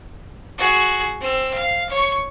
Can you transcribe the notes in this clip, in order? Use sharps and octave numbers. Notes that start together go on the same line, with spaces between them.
F#4 G#4
C4 E6
F5
C#5 C#6